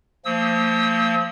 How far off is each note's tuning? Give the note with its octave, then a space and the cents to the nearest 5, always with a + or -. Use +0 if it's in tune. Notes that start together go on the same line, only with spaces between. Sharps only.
F3 +0 A#3 -35 E6 -35